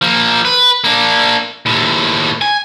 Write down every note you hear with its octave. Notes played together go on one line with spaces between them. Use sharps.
F3 A#3
B4
A#3 D4
D#2 A2
G#5